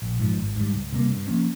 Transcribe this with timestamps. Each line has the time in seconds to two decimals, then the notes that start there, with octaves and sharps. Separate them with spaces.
0.02 A#1
0.20 G#2 F3
0.38 G#1
0.56 G#2 G3
0.74 C#2
0.92 C3 G3 A#3
1.10 G2
1.28 F3 A#3 C#4